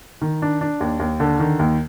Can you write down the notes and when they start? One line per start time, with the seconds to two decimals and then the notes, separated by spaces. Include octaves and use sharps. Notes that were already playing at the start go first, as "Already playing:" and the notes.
0.22 D#3
0.42 D4
0.61 D4
0.81 D#2
1.00 D#2
1.20 D3
1.40 D#3
1.59 D#2